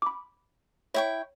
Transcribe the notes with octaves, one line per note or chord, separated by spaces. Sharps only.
B5 D6
E4 C#5 G5 C#6